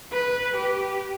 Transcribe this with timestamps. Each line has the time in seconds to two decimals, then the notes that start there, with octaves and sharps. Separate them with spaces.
0.11 B4
0.57 G4